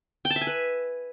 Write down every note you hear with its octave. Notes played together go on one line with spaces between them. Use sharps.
G5
A5
E5
G#5
B4